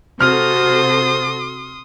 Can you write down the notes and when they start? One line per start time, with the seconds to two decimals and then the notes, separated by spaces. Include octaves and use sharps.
0.21 C3 F#4 A4 C5 C6 D#6 F6